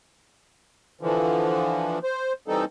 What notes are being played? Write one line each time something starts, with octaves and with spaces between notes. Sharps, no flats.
D3 E3 F3
C5
E3 G3 C4 D#4 A4